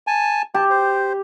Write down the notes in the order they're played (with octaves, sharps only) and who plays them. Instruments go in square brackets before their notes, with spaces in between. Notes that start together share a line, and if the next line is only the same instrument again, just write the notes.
[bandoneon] G#5 A5
[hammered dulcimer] G4 [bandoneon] A5
[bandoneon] C5